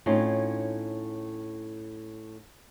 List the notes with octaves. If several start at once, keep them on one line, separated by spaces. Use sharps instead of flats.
A2 C4 C#4 D#4 F4